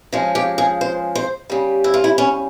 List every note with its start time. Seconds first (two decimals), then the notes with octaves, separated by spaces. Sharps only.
0.12 C#3 F3 G#3
0.35 G4
0.58 G#4
0.81 C5
1.15 C5
1.50 C#3 G3
1.84 E4
1.94 F4
2.04 E4
2.18 C#4